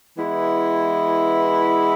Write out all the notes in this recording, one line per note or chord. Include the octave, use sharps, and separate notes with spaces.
E3 G#3 B3 E4